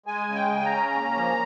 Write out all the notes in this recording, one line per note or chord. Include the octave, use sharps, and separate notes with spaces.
G#3 G#5
C#3
G5
C#3 G#5
A#5
C#4
A#3
F3